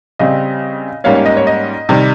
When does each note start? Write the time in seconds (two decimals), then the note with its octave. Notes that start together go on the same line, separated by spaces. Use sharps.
0.19 C#3 G3 C4 D#5
1.04 G#2 G3 A#3 C#4 C#5 F5
1.15 C#5 F5
1.26 D#5
1.37 C#5
1.47 D#5
1.89 C3 D#3 G3